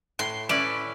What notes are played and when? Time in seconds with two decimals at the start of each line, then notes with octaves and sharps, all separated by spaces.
0.19 A2 C6
0.49 C#4 E4 B4 D5